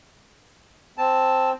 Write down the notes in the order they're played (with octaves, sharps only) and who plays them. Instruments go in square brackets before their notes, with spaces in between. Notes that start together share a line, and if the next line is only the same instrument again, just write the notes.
[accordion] C4 [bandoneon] A5